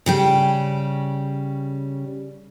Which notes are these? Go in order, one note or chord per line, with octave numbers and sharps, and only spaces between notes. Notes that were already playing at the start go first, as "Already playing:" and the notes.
C#3 G3 G5